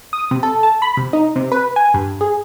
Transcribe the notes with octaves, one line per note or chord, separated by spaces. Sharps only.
D#6
C3
A4
A5
B5
C3
D#4
C3
B4
G#5
G2
G#4